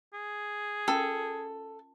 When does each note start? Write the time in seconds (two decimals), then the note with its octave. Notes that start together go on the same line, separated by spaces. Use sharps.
0.14 G#4
0.88 C#4 F4 A4 A#4